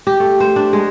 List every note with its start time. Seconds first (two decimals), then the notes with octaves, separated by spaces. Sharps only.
0.07 G4
0.20 A3
0.40 C5
0.56 D4
0.73 G#3